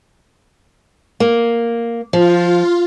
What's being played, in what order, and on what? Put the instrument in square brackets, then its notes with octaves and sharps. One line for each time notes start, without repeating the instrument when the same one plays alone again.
[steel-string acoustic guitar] A#3
[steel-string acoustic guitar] F3 [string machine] F4